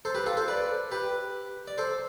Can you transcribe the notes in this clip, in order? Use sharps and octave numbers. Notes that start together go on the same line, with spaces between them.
A4 C5
G4 B4
F4 A4
A4 C5
B4 D5
G4 B4
D5
A4 C5